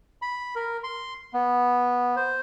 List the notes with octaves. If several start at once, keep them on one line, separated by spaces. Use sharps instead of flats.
B5
A#4
C6
B3
C5